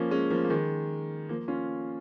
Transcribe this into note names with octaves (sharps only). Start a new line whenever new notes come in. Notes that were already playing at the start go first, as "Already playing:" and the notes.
Already playing: F3 A#3 C#4
G#3 C#4
F3 A#3
A#3
D#3 G#3
F3 A#3
C#4 F4